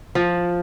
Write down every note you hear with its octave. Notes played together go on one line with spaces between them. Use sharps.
F3